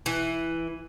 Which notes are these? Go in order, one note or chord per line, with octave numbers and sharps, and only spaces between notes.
E3